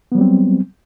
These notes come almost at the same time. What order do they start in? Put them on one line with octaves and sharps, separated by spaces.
B3 F#3 G3 C4